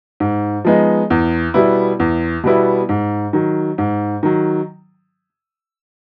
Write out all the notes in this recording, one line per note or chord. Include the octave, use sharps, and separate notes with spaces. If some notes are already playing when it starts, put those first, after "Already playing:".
G#2
F3 G#3 B3 D#4
E2
B2 G3 B3 E4
E2
B2 G3 B3 E4
G#2
D#3 F#3
G#2
D#3 F#3